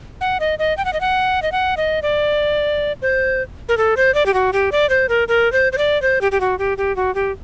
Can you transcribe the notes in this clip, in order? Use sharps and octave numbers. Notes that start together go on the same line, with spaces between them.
F#5
D#5
D#5
G5
F#5
D#5
F#5
D#5
F#5
D#5
D5
C5
A#4
A4
C5
D5
G4
F#4
G4
D5
C5
A#4
A#4
C5
C5
D5
C5
G4
G4
F#4
G4
G4
F#4
G4